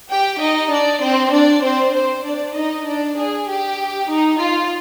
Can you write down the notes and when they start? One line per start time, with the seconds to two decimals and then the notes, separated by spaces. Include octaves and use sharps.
0.10 G4 G5
0.40 D#4 D#5
0.71 D4 D5
1.02 C4 C5
1.32 D4 D5
1.63 C4 C5
1.94 C4 C5
2.24 D4 D5
2.55 D#4 D#5
2.86 D4 D5
3.17 G#4
3.48 G4
4.09 D#4
4.39 F4